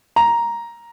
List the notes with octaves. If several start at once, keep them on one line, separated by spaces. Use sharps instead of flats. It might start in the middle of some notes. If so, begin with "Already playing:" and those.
A#5